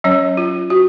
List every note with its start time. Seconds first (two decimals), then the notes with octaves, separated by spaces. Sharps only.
0.04 F#3 C#4 C#5
0.37 F4
0.70 F#4